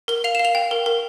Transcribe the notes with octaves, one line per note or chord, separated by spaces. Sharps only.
A#4 G7
F5 F7
E7
F5
F7
G5
A#4
A#4